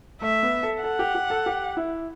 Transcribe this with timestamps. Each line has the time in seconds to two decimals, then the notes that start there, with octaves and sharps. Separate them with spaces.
0.21 A3 E5
0.43 B3
0.63 A4
0.83 A4 F#5
0.99 G4
1.15 G4
1.30 A4
1.46 G4
1.77 E4